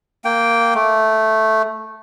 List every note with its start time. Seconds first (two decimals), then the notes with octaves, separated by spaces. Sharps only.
0.25 A#3 G5
0.75 A3